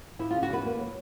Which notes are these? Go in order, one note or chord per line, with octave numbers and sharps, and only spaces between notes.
F3 E4
C#3 F4
F#4
E2 B4
A#3
F#3